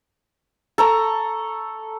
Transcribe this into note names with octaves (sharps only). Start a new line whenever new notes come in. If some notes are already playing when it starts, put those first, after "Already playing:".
A4 A#5 C#6